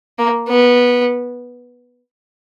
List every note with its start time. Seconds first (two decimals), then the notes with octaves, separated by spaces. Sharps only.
0.18 A#3
0.49 B3